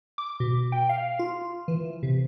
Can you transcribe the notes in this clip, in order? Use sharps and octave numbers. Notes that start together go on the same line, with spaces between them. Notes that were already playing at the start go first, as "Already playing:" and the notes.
D6
B2
G5
F5
F4
E3
C3